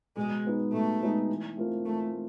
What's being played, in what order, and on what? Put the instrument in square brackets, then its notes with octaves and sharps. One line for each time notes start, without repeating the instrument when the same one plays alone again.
[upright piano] B2 [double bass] G#3
[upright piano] G#3 B3 D#4
[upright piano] B2 [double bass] A3
[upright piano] G#3 B3 D#4
E3
A3 C4 F4 A#4
[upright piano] E3 [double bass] A3
[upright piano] A3